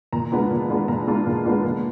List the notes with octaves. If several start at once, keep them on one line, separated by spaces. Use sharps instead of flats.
A#2 A#5
G#3 B3 D4 F4
A#2
G#3 B3 D4 F4
A#2 A#5
G#3 B3 D4 F4
A#2
G#3 B3 D4 F4
A#2